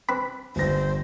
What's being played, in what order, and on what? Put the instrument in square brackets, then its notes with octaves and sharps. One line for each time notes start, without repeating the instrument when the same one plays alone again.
[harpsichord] C4 B4 B5
[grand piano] G1 A#6 [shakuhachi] C5